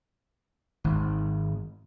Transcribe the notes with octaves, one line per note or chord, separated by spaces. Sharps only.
G#1